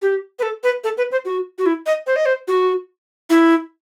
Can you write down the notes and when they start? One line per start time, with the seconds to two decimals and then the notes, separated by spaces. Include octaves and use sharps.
0.02 G4
0.39 B4
0.43 A4
0.64 B4
0.84 A4
0.98 B4
1.12 C5
1.25 F#4
1.59 F#4
1.66 E4
1.86 D#5
2.07 C5
2.16 D#5
2.26 C5
2.48 F#4
3.30 E4